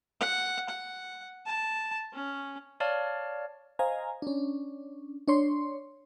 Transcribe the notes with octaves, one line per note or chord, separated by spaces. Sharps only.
F#5
F#5
A5
C#4
C#5 D5 F5 A5 F6
C5 D#5 F5 G#5 A#5
C#4 D4
D4 C#5 C6